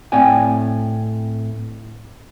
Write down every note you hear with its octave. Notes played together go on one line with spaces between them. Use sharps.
A2 C4 D5 G5 G#5